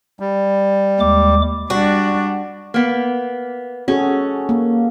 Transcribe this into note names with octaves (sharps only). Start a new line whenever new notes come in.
G3
D#2 G#3 D6
G3 D4 F#4
A#3 B3
C#4 F#4 G#4 A4
A#3